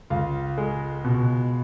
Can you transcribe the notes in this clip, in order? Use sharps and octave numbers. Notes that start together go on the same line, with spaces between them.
C#2 F4 F5
G#3
B2